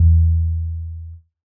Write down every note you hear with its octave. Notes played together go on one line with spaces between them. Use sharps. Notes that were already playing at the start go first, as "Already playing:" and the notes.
Already playing: E2